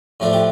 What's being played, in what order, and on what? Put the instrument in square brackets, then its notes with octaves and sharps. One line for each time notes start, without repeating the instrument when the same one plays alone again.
[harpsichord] A2 F3 A3 D4
G4